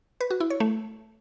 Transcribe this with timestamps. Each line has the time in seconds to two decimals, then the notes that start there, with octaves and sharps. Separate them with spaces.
0.21 B4
0.30 F#4
0.40 E4
0.50 C#5
0.60 A3